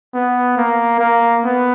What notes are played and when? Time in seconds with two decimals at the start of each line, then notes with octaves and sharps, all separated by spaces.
0.14 B3
0.57 A#3
1.00 A#3
1.44 B3